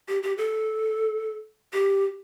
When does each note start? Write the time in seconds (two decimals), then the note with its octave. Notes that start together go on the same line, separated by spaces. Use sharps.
0.08 G4
0.23 G4
0.38 A4
1.73 G4